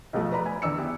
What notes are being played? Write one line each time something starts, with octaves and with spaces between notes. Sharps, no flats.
B1 B2 F3 A3
B4 D5 A#5 B5
G#5
E2 D3 D5 E6 C#7
B3 E4 G4